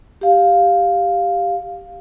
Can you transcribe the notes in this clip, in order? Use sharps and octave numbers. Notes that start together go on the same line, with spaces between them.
G4 F5